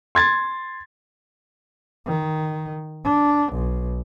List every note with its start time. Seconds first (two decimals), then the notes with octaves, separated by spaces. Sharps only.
0.15 C6 G#6 A6
2.06 D#3
3.04 D4
3.53 B1